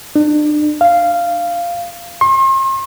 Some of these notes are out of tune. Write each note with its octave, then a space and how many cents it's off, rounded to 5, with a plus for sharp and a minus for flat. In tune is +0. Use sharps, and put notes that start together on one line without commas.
D4 +35
F5 -10
C6 +40